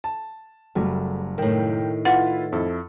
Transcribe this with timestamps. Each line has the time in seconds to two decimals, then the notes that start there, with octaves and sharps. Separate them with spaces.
0.04 A5
0.75 F#1 F#3 G3 A3
1.38 A2 D#3 A#4 G5
2.05 E4 F4 B4 F#5 A6
2.52 F2 E4 A4